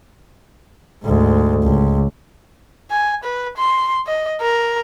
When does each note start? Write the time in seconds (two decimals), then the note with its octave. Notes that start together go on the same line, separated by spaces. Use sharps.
1.04 D2 G#2
1.62 C#2
2.90 G#5
3.23 B4
3.57 C6
4.06 D#5
4.41 A#4